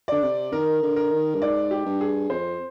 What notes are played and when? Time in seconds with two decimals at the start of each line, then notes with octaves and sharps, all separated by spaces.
0.08 D3 D5
0.23 C3
0.52 D#3 A#4
0.83 D3
0.96 A#4
1.12 D#3
1.35 G2
1.41 G#2 D5
1.71 G4
1.86 G2
2.01 G#4
2.30 F2 C5